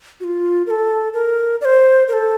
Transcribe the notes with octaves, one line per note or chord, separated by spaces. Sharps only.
F#4
F4
A#4
A4
A#4
D5
C5
A#4
A4